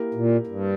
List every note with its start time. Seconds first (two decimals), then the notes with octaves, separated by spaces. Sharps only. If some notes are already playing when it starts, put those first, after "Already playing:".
Already playing: A#3 E4 G4 A#4
0.14 A#2
0.47 G2